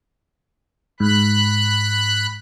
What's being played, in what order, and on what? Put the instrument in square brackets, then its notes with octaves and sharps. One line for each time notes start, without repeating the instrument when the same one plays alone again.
[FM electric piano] G#2 [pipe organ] B5 F#6